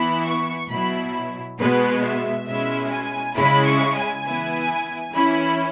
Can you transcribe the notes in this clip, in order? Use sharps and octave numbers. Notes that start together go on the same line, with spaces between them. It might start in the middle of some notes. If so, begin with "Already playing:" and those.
Already playing: E3 B3 E4 B5
C#6
B2 F#3 E4 B5
B2 G#3 B3 B4
E5
B2 G#3 C#4 E4 E5
G#5
C#3 G#3 E4 B5
C#6
G#5
E3 B3 E4
E3 C#4 E4 B5